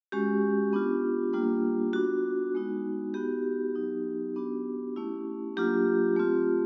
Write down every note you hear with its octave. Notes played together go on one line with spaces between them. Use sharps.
G#3 C#4 F#4 G4
B3 D4 F4
G3 A#3 D4 F4
B3 D4 F4 F#4
G#3 B3 D#4 F#4
B3 D#4 F#4 G4
F#3 B3 D#4
B3 D4 F#4
A3 C#4 E4
F#3 A#3 D4 F4 G4
A3 C4 F4